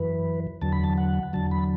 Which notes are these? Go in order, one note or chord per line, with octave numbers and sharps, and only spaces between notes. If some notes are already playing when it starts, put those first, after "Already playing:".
Already playing: F#2 E3 B4
E2 D3 F#3 A5
B5
A5
F#5
E2 D3 F#3 A5
B5